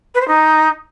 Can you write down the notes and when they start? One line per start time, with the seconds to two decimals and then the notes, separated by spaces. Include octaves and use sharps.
0.15 B4
0.21 C5
0.28 D#4